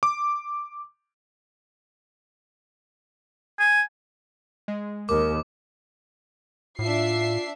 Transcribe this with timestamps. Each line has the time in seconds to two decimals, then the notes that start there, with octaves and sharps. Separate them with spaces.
0.03 D6
3.59 G#5
4.68 G#3
5.09 D#2 A#4 D6
6.79 A2 D4 F4 E5 C7